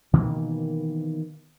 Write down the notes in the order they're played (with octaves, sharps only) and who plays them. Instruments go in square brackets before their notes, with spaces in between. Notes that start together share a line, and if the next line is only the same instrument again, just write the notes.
[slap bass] B2 D#3 E3 A#3